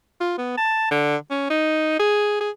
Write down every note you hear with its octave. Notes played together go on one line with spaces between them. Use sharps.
F4
B3
A5
D3
C#4
D#4
G#4
G#4